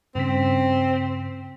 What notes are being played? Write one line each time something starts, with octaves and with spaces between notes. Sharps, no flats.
G2 C#3 C4 B6